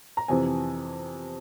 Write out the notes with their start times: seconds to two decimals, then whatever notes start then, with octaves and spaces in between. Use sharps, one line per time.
0.17 A#5
0.28 F2 C3 E3 G#5